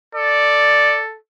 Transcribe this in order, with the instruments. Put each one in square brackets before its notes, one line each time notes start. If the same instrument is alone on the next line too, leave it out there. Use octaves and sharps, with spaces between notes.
[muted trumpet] A4 [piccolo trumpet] D5